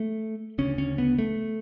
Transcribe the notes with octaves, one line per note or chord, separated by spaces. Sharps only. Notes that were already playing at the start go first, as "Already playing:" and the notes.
Already playing: A3
D2 C#3 C#4
C#4
B3
A3